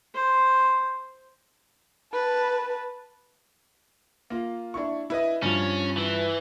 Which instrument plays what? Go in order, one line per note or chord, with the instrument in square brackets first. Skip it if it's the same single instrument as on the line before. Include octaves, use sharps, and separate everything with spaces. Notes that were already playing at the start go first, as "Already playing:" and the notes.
[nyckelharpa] C5
[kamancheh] B4 A5
[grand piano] A#3 F4
D4 E4 C#6
E4 B4 D#5
[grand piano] G2 F3 [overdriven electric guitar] C#4
[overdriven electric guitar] E3